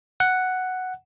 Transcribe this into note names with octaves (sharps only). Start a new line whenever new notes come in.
F#5